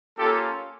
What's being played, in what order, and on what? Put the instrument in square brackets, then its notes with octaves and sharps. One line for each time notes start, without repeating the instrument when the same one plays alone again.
[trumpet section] A#3 C#4 F4 G4 A4